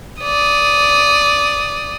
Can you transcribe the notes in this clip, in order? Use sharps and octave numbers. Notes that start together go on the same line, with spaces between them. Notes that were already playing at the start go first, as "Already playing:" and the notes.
D5 D#6